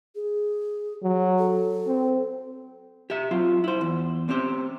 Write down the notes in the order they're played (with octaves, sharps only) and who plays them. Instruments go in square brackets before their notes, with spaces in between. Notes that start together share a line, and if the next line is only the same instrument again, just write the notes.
[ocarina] G#4
[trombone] F#3
[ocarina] A4
[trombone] C4
[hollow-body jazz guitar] G4 E5
F#3 C4 F4
E4 C5
E2
C4 C#4 G4 C5